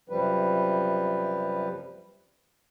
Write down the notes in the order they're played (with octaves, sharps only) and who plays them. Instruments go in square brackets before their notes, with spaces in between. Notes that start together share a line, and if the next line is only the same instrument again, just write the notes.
[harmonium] F#2 C3 F3 G3 B4